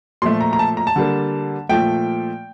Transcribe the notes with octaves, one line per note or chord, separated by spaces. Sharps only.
A#2 F3 A3 C6
A#5
A#5
A5
A#5
A5
D3 G3 A#3
A#2 F3 A3 G5